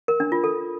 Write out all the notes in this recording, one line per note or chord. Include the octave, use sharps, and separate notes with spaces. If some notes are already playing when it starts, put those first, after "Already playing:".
A#4
D4
F4
A4